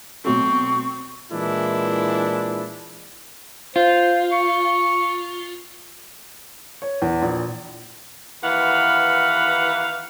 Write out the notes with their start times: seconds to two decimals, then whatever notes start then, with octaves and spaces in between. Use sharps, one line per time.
0.25 B2 F#3 A3 C4 C#6
1.32 A#2 E3 G#3 D4 E4
3.76 F4 C5
4.33 C#6
6.82 C#5
7.02 E2
7.22 A#1
8.43 D#2 E3 B4 F5 F#5